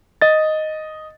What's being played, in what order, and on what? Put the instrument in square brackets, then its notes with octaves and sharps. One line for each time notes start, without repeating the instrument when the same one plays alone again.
[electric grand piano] D#5 A6